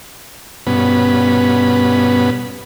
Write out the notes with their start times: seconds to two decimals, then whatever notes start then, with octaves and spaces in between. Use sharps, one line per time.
0.67 G2 B2 B3 C#4 B5